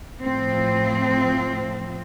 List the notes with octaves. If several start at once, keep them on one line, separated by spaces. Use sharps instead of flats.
A2 F3 C4